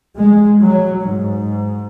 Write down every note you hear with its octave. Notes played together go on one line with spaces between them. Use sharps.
G#3
F#3
G#2